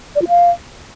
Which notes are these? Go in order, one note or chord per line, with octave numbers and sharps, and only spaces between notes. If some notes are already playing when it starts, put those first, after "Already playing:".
D5
F4
F5